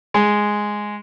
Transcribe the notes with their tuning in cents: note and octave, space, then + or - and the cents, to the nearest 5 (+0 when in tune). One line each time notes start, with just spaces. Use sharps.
G#3 +0